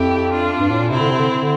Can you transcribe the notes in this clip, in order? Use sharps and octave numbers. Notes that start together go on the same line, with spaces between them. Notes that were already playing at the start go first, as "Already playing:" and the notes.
Already playing: F2 E4 G4
D4 F4
G2
A2
A#2
C3 C4 E4
D3
C3
D3
D3